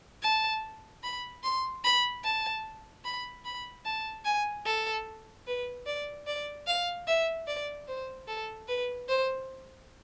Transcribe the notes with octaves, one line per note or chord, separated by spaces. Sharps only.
A5
B5
C6
B5
A5
B5
B5
A5
G#5
A4
B4
D5
D5
F5
E5
D5
C5
A4
B4
C5